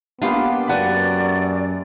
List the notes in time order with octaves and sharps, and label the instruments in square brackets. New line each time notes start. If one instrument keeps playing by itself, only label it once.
[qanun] A#3 G4 [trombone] B3 [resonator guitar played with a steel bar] D4 F4 F5
[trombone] F#2 [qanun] F#4 G4 [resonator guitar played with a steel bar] B4 F#5 A5 [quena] D5